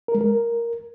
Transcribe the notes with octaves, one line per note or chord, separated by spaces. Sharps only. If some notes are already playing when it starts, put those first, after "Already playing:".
A#4
G#3
A#4